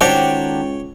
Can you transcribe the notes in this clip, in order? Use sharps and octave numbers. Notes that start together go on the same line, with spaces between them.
C#2 D#3 D4 F#4 G4 C5 C#5 G5